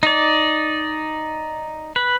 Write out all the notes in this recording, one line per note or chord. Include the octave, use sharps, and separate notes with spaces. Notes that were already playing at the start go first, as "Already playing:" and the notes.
D#4 D5
B4